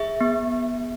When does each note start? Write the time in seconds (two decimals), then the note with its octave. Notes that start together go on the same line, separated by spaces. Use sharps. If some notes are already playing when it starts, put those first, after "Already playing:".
Already playing: G#4 E5
0.21 B3